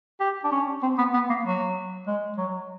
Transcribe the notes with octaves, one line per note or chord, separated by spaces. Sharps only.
G4
D4
C#4
C4
B3
B3
A#3
F#3
G#3
F#3